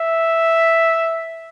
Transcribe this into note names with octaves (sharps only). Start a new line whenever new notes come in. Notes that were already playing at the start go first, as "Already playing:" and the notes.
Already playing: E5